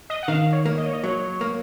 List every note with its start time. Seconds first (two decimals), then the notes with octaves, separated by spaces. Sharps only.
0.10 D#5
0.23 F#5
0.28 D#3 F5
0.52 C#5
0.66 A#3
0.78 D#5
0.86 C#5
0.93 D#5
1.04 F#3 C#5
1.41 A#3